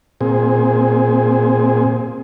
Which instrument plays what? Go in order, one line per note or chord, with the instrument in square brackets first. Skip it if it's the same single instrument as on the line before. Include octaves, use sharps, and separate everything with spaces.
[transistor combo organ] A#2 C4 G#4